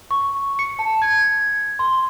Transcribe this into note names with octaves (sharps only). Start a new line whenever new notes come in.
C#6
C#7
A5
G#6
C6